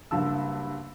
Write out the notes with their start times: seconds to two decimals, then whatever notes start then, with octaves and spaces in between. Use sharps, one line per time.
0.11 F#1 G2 A5 E6